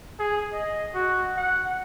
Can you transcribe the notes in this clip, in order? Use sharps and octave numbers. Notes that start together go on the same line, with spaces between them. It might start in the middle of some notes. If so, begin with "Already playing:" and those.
G#4
D#5
F#4
F#5